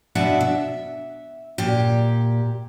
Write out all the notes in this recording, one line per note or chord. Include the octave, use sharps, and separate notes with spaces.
B2 D4 E5 F#5
E5
A#2 G4